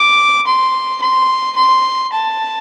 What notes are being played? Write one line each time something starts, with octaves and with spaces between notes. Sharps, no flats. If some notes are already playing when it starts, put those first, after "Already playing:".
Already playing: D6
C6
C6
C6
A5